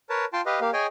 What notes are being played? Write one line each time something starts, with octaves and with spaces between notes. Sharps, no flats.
A#4 B4 C#5 A5
F4 G5 A5 C6
G4 B4 D#5 F5
A#3 G4 F5
G#4 C#5 D#5 G5 G#5